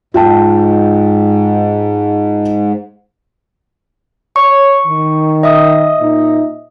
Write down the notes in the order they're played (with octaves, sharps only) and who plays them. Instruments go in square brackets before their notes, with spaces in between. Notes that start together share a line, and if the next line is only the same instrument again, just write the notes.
[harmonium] G#2 [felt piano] F4 G5 A5
[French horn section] C#5 [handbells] C#6
[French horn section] D#3
[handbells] D#5 E5 D#6
[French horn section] A#2 D#4